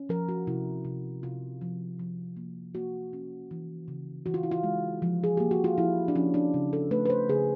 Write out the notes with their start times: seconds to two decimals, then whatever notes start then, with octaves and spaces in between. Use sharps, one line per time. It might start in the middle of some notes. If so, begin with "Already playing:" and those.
Already playing: C#4
0.09 F3 A#4
0.29 F#4
0.47 C3 E4
0.85 C3
1.23 C3 F4
1.61 F3
1.99 F3
2.37 A#3
2.75 A#3 F#4
3.13 C#4
3.51 E3
3.88 C#3
4.26 E3 F#4
4.34 F4
4.43 E4
4.51 F4
4.63 G#3
5.02 F3
5.24 G#4
5.37 A#3 G4
5.51 F#4
5.64 F4
5.78 F3 E4
6.08 D4
6.15 F3 C#4
6.34 D4
6.54 C#3
6.73 A4
6.91 A3 B4
7.06 B4
7.10 C5
7.29 C#3 G#4